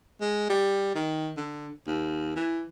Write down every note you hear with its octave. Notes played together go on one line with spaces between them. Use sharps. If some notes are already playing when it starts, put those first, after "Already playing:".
G#3
G3
D#3
D3
D#2
E3